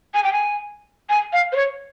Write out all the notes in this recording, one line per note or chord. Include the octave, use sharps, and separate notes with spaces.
G#5
G5
G#5
G#5
F5
C5
C#5